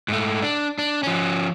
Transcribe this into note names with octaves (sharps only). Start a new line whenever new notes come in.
G#2 A3
D4
D4
F3 C#4